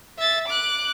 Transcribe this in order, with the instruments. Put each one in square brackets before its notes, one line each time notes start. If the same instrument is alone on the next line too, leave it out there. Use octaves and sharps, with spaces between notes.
[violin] E5 A6
D6 F#6